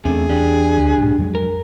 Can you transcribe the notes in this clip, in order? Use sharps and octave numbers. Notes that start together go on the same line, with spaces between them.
E2 C3 A3 C#4 D4 G#4
E2 D4 G4
D2
B1 G#2
F2 F#3 G#3
A#4